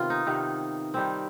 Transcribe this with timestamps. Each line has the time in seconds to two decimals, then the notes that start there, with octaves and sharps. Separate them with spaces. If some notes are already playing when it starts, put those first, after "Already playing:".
Already playing: C3 D#3 B3 F4
0.10 D#4
0.26 C3 D#3 B3
0.94 D#3 G3 C4